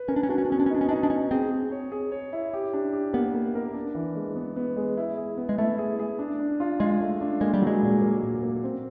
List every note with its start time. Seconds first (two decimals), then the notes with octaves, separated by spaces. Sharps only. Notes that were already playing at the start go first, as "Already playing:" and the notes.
Already playing: B4
0.08 C#4 A#4
0.16 D4
0.23 C#4
0.29 D4 F#4
0.38 C#4
0.45 D4
0.50 B3 C#4
0.60 D4
0.66 C#4
0.70 D4 D#4
0.81 C#4
0.89 D4 D#4
0.96 C#4
1.03 D4
1.10 C#4 D#4
1.31 C4 G#4
1.51 G#4
1.72 C#5
1.92 G#4
2.12 C#5
2.33 E4
2.53 G4
2.74 D4
2.93 G4
3.13 A#3 B3
3.34 A#3
3.55 A#4
3.74 D4
3.95 E3
4.16 G#3
4.36 B3
4.56 B3
4.77 G#3
4.97 E4
5.17 G#4
5.37 B3
5.49 G#3
5.58 A3 E4
5.78 G#4
5.99 G#4
6.19 D4
6.40 D4
6.60 F4
6.80 G#3 F4
7.01 A3
7.21 D4
7.41 G#3 A#3
7.54 G3
7.62 F#3 G#3
7.82 A#2
8.02 A#3
8.23 A#2
8.43 A#3
8.64 C4